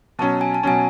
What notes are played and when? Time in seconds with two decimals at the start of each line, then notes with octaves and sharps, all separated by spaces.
0.19 B2 F#3 C#4 A5
0.41 G#5
0.54 A5
0.63 B2 F#3 C#4 G#5